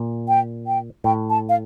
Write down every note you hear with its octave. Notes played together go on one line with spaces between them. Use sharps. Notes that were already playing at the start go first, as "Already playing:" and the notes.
Already playing: A#2
G5
G5
A2 G5
A5
F5